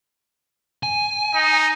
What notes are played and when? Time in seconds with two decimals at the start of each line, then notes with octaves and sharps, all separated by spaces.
0.83 G#5
1.35 D#4